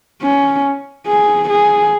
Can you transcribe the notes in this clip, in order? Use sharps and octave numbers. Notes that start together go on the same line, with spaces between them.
C#4
G#4
G#4